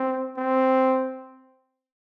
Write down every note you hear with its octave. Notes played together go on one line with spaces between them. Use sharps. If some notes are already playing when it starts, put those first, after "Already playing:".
Already playing: C4
C4